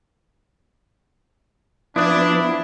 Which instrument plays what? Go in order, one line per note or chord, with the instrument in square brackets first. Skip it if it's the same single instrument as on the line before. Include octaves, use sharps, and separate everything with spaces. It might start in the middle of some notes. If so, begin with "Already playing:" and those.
[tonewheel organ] F3 B3 [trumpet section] D4 [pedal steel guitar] E4 [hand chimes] E5 D#6